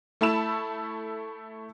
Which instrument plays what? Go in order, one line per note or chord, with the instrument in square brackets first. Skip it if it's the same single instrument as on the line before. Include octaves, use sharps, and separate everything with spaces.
[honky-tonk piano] A3 E4 A5 B5 E6 E7